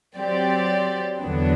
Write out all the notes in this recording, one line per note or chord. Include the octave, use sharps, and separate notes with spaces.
F#3 C4 G4 D5
E2 D3 F#3 B3 D4